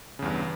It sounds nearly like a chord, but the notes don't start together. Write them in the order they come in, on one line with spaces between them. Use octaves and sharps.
C#3 E2 G2